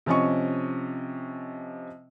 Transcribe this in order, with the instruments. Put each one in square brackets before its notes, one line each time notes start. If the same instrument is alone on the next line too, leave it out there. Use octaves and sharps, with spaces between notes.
[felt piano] C3 F3 C#4 D#5 C#6